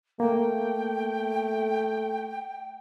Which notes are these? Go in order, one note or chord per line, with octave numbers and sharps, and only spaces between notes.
A3 A#3 G5